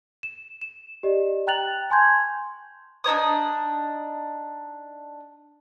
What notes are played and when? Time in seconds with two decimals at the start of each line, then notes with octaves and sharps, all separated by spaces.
0.23 E7
0.62 E7
1.03 G4 D5 D#5
1.47 G5 A#5 F#6 A6 F7 F#7
1.90 G#5 A5 C6 C#6 G6 G#6
3.04 D4 D#4 C#5 D#6